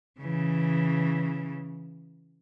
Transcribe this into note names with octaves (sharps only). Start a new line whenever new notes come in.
C#3 E3